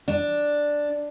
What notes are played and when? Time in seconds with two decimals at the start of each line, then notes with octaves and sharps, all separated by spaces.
0.08 D4